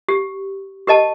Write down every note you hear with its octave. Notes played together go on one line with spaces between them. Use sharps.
G4
G4 A#4 D#5 A5